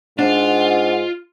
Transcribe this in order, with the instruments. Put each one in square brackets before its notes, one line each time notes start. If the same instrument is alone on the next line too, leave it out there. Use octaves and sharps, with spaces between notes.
[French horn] G#2 [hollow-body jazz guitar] D4 [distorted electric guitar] F4 [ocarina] F#5